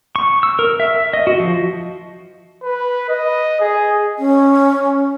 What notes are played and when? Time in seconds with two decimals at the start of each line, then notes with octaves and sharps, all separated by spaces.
0.16 C#6
0.43 E6
0.59 A#4
0.80 E5
1.13 D#5
1.27 F#4
1.40 F3
2.63 B4
3.09 D#5
3.60 G#4
4.18 C#4